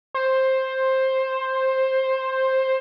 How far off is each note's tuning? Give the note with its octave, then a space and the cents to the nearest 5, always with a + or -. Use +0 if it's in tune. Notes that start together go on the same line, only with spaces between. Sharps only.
C5 +10